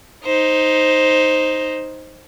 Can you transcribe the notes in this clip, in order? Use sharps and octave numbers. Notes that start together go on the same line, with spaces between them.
D#4 C5